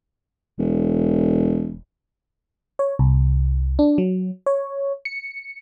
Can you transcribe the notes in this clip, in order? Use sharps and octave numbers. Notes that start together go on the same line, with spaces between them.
E1
C#5
C2
D4
F#3
C#5
C#7